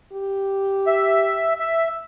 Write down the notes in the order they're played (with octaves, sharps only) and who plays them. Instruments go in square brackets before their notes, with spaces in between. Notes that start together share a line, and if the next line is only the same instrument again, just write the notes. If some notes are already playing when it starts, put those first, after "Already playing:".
[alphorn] G4
[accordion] E5
E5